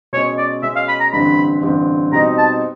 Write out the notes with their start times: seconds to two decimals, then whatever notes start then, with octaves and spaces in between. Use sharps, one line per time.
0.13 B2 C#5
0.16 G#3 C#4
0.38 D5
0.63 B2 G#3 C#4 E5
0.76 F5
0.88 B5
1.00 A#5
1.13 A1 G2 D3 G3 C4 B5
1.62 A1 G2 D3 G3 C4
2.12 B2 G3 C4 D#4 A#5
2.38 A5